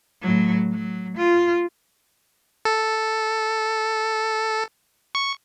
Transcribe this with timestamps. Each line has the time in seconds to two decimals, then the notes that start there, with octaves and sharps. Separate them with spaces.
0.22 A2 F#3
0.72 F#3
1.17 F4
2.65 A4
5.15 C#6